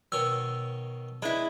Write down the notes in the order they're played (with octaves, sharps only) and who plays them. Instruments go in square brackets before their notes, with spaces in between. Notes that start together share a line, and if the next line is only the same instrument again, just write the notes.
[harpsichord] B2 D#3 C#5 [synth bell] E6
[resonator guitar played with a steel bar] G#3 E4 [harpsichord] D4 B4 B5